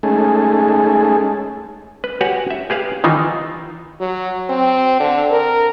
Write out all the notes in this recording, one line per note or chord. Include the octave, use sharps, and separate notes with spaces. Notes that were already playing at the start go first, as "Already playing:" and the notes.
G#3 A3 C#4 D#4 G#4 A4
B4
F#4 G4 B4 C#5 F#5 G#5
E5
G4 G#4 B4 F5
D#3 E3 D#4 F4
F#3
C4
D3
A#4